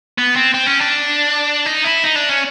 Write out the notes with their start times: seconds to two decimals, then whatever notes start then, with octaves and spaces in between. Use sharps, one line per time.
0.18 B3
0.36 C4
0.54 C4
0.67 C#4
0.80 D4
1.66 D#4
1.84 E4
2.04 D#4
2.16 D4
2.29 C#4